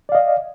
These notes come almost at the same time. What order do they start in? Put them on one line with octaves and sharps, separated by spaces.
D5 F5 D#5